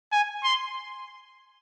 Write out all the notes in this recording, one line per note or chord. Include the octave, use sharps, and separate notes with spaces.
G#5
C6